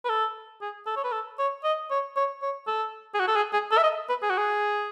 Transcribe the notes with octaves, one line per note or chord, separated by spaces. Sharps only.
B4
A4
G#4
A4
C#5
B4
A4
C#5
D#5
C#5
C#5
C#5
A4
G#4
F#4
A4
G#4
G#4
A4
E5
D#5
B4
G#4
F#4
G#4